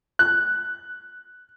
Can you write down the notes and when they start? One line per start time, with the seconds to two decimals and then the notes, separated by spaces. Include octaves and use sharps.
0.19 F#6